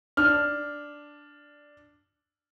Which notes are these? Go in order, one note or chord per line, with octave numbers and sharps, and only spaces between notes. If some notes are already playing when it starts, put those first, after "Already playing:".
D4 F6